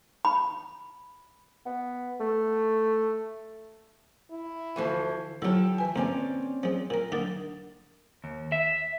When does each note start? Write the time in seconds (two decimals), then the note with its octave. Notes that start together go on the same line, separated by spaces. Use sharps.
0.25 B5
1.66 B3
2.20 A3
4.31 E4
4.76 D2 E3 F3
5.42 D3 F#3 E4 F4 G4 A4 E6
5.78 E3 B4 G#5
5.96 D2 C3 A#3 C4 C#4 D5
6.63 F3 G#3
6.90 A#2 A#4
7.12 D3 F#3 A#3 D4 D#4
8.24 D#2
8.52 E5